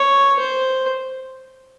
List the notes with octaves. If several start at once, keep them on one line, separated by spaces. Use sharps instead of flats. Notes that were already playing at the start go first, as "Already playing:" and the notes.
Already playing: C#5
C5